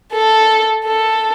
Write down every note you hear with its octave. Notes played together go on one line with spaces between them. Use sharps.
A4
A4